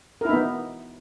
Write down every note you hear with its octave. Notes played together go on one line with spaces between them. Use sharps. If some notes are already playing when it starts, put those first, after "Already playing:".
B3 D#4 E4 A#4